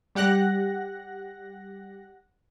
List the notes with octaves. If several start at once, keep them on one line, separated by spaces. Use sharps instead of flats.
G3 G4 F#5 F#6 A#6